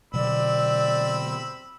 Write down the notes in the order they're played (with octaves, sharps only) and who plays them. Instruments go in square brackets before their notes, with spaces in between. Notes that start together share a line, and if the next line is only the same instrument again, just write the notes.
[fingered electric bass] B2 D3 F#3 [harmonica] C4 B5 E6 [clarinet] D5